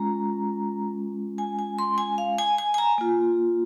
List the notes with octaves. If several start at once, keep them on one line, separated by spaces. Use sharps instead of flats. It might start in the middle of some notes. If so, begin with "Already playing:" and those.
Already playing: G#3 C#4 F4 A#5
G#5
G#5
C6
G#5
F5
G#5
G#5
G#5
A#5
A#3 F4